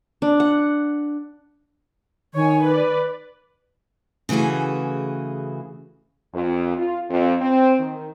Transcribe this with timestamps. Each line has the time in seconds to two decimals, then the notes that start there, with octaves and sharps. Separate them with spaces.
0.22 D4
0.40 F#5
2.34 D#3 C#5 G#5
2.63 B4 D5
4.29 C#3 E3 A3 F#4 G#4
6.34 F2
6.77 F4
7.10 F2
7.41 C4
7.80 D#3